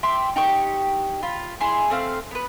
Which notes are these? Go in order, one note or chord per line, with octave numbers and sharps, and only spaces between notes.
E5 G5 C6 D6
D#4 G4 G5 C#6
F4 B5
E4 G#4 C6
A3 C4 F5
B3 B4